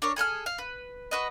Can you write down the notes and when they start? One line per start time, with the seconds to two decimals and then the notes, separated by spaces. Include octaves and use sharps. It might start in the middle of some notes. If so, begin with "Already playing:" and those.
0.02 D4 A#4 C#5
0.16 G#4 A4 D#6 F6
0.46 F5
0.58 B4
1.11 F#4 B4 D#5